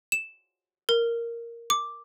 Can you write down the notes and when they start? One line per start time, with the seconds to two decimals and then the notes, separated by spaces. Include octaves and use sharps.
0.12 E7
0.89 A#4
1.70 D6